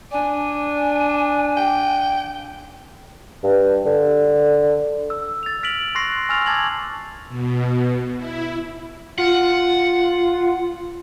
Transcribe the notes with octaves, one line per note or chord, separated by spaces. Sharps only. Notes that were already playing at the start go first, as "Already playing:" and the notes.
D4 G#5
G5
G2
D3
E6
A6 F7
F6 B6 D7 F7 F#7
C6 C#6 F#6 A#6 C7
G#5 C#6 E6 F6 A6 F7
A5 D6 G#6 A6 F#7
B2
E4
F4 F#5